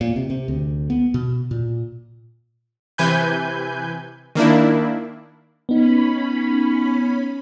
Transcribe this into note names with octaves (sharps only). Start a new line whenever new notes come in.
A#2
C3
C3
D2
B3
B2
A#2
C3 E3 B4 G#5 G6
D#3 A#3 D4 E4
B3 C#4 D#4 B5